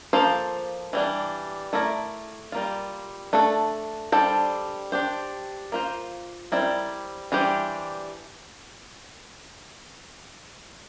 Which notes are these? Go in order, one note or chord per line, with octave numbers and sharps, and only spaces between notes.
F3 A#3 F4 A4 C5
E3 G3 D4
A3 E4 A#4 D5
G3 A#3 F4
A3 D4 A4
G3 D4 A4 C5
D4 G4 C5
A#3 F4 C5
G3 C4 E4 A#4 D5
E3 G3 D4 G4 C5